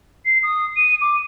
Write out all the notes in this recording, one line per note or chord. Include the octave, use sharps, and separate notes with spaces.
C7
D#6
D#7
D6